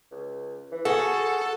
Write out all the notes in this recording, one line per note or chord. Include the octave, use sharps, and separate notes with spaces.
C#2
E3
F#4 G#4 A4